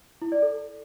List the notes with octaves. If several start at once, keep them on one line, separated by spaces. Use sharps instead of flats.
E4
D5
A4